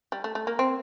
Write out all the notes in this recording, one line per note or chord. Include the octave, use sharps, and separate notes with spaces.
G3
A3
A3
A#3
C4